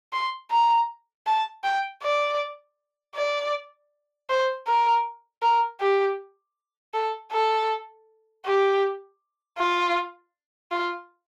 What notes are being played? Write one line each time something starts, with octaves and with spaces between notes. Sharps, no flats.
C6
A#5
A5
G5
D5
D5
C5
A#4
A#4
G4
A4
A4
G4
F4
F4